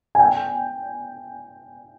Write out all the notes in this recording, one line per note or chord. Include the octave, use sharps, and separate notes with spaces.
G#5
G5